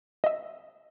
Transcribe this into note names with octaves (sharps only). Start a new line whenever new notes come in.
D#5 E5